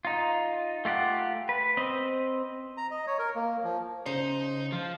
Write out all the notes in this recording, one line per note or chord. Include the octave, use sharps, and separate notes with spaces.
D#4 F4
A3 F4 G4 F#5
B4
C4 D#5
A#5
D#5
C#5
A#4
A#3
F3
C#3 D#4 C5
F3 F4